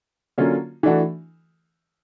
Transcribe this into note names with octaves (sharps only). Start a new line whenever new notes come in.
D3 F#3 A#3 C#4 F4
E3 A3 D4 F#4 A4